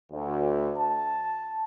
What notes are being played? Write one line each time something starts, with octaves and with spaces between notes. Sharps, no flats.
D2
A5